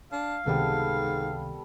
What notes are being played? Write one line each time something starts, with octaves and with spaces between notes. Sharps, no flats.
D4 F5
C#2 G#2 C3 D#3 G3 B3 A4